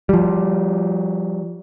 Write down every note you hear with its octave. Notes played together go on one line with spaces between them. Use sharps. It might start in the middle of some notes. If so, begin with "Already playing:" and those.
F3 G3